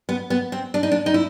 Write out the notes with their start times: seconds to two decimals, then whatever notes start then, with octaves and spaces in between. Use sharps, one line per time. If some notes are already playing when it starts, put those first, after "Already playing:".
0.09 B3
0.30 B3
0.52 C4
0.74 D4
0.83 D#4
0.91 D4
1.06 D#4
1.14 E4